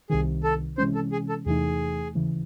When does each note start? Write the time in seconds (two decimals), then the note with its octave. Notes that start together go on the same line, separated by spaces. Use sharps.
0.10 C2 C3 D#3 G#4
0.44 A4
0.78 C3 E3 G#3 C#4 C5
0.95 A4
1.12 G#4
1.29 A4
1.46 E2 C3 E3 A3 D#4 G#4
2.15 D#2 C#3 E3